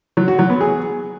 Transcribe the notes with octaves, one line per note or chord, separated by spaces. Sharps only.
F#3
F#4
F#3
B3
G#4